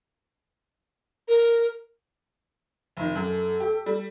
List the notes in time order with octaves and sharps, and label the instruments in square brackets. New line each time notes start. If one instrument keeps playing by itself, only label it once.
[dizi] A#4
[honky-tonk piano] F1 D#3
[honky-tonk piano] F#2 [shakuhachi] A4
[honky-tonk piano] G4
G3